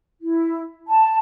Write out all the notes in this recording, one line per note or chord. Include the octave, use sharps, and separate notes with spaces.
E4
A5